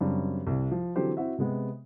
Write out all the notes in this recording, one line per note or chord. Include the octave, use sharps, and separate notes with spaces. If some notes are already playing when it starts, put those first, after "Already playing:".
F#2 C#3 G3 C4 D4
C2 C3
F3
D3 E3 F#3 C4 G4 C5
C4 E4 F#4 E5
C3 G#3 B3